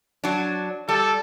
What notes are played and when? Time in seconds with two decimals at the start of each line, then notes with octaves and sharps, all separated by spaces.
0.24 F#3 D4
0.89 G3 A4